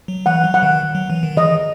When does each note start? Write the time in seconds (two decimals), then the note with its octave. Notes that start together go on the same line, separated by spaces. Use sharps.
0.08 F#3
0.26 E3 F#5
0.44 F#3
0.54 F#5
0.63 D#3
0.95 F#3
1.10 E3
1.23 D#3
1.37 E3 D#5